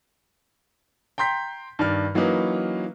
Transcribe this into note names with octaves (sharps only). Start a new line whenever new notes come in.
G5 A#5 C6 G6 B6
G2 D#3 D5 F6
E3 F#3 A#3 C#4 D#4 B4